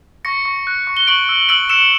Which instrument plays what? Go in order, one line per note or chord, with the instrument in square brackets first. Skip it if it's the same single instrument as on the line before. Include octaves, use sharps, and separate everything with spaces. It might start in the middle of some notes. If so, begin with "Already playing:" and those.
[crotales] C#6 A#6 C#7
C#6
F#6
C#6
G7
C#6 D7 F#7
E6
E6 D7 F#7
E6 C#7 E7